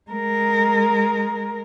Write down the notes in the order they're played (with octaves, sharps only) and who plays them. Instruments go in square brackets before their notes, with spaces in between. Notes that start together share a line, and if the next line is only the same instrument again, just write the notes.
[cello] G#3 A#4